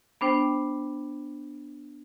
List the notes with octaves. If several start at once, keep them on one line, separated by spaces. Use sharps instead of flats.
B3 D4 C5 G5